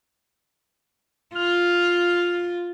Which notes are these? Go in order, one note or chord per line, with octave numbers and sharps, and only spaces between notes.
F4 F6